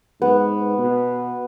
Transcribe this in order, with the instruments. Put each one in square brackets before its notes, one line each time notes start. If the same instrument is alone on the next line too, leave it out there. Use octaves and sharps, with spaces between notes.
[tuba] G#2 [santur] B3
[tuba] B2